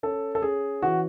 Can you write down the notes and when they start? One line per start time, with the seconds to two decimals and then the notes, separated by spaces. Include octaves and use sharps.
0.03 C#4 A4
0.35 A4
0.42 C#4 G#4
0.82 E3 F#4